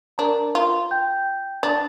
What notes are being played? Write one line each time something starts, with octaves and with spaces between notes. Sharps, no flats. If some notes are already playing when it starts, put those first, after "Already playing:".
D4 A#4 A#5
F4
G5 G6
D4 A5 A6